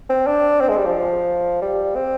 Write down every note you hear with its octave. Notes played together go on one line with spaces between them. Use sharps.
C4
D4
C4
G#3
G3
F3
G3
C4